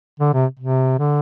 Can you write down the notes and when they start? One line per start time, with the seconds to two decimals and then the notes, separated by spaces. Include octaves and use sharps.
0.20 D3
0.34 C3
0.59 C3
0.99 D3